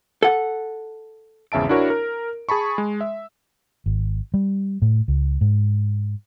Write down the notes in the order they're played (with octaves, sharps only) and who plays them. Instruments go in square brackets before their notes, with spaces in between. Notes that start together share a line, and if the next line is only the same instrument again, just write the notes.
[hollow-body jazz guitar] A4 F#5
[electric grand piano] G#1 E2 C#3 E5 A5 D7
D4 E4 F#4 A#4 C#5
A#4
G#4 A5 B5 C#6
G#3
E5
[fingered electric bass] G#1
G3
A2
C#2
G#2